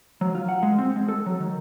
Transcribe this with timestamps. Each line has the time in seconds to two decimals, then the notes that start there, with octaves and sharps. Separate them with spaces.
0.21 F#3
0.35 F4
0.49 F#5
0.63 G#3
0.78 C4
0.96 G#3
1.08 A4
1.26 F#3
1.40 D#3